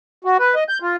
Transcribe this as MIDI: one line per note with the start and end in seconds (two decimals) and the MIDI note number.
0.25 0.37 66
0.39 0.55 71
0.55 0.64 75
0.69 0.78 91
0.82 0.96 65